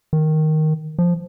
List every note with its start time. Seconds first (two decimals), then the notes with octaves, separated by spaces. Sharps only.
0.13 D#3
0.99 F3